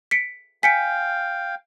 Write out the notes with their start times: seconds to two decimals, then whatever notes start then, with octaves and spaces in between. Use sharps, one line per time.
0.11 B6 C#7 D7
0.63 F5 G5 G#5 B6 C#7 D7